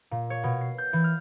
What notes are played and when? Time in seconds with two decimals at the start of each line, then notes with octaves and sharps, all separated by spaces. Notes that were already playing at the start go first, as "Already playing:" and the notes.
0.11 A#2
0.30 C#5
0.43 B2
0.61 C7
0.78 G6
0.93 E3
1.04 F6